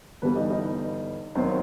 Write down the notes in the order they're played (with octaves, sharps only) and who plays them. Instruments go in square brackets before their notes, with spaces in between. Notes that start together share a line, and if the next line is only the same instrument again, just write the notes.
[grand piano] G1 G2 E3 G3 [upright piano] B3 B4
[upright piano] D#4 D#5
D#4 D#5
[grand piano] E1 D#2 D#3 F#3 [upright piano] C4 C5